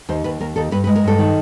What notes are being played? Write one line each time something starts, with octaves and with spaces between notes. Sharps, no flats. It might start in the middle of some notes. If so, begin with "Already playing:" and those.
D#2 C5
D#2 B4
D#2 A#4
D#2 A4
G2 B4
B4
G#3
A#4
G2 A4
D#3